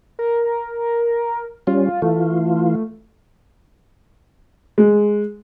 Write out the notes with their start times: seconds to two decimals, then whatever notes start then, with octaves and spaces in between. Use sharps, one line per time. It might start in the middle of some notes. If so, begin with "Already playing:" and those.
0.19 A#4
1.67 G3 C#4 F4
2.02 E3 A3 F4
4.78 G#3